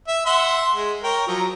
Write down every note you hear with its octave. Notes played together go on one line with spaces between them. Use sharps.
E5
E5 F#5 C6
G#3
A#4 C#5 G5
F3 F#3 A#5